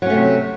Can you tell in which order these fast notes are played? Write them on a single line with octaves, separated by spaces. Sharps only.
F#3 C#4 A3 C3